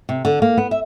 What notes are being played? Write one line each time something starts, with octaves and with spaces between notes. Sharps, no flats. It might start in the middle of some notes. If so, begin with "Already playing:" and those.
C3
D3
A#3
B3
E5